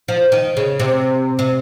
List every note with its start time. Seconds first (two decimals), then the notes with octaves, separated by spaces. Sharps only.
0.08 F3
0.32 D#3
0.57 C#3
0.80 C3
1.39 C3